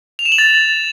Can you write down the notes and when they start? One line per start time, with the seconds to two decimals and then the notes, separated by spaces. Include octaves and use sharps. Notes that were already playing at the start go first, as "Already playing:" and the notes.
0.19 F7
0.25 E7
0.32 F#7
0.38 A6